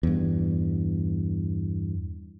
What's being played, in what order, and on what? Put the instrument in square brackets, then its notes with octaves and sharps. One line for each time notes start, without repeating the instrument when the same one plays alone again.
[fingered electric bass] E2 G2